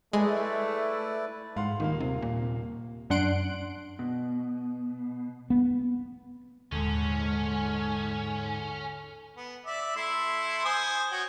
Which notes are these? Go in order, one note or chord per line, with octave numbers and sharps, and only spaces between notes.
G#3 A3 E4 B4 D5
G#2 F5 F#5 C6
D#1 D#3 A#3 F5
C3
A#2
F#2 D4 F#5 C6 F#6 D7
B2
B3
D#1 G#2 D3 C#4
B3
D5 E5
A3 E4 C6
C5 G#5 D#6
F#4 C#5 G5